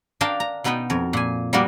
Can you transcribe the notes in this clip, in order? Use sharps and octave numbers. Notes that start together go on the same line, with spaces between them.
D4 A#4 F5 G5 A5
A#5
B2 B3 D#4 B4 G5
F2 A#4
A#2 G#5
G3 A#3 B3 F#4 A#4